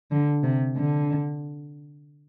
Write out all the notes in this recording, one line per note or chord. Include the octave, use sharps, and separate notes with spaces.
D3
C3
D3